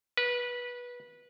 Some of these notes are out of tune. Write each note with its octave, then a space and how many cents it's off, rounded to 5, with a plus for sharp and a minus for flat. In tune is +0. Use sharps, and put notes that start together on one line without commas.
B4 -20